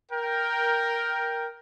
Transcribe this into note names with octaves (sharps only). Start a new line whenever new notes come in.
A#4 G5